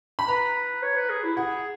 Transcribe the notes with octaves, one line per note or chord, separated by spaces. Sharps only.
B5
B4 A#5
C#5
B4
G#4
E4
G#4 F#5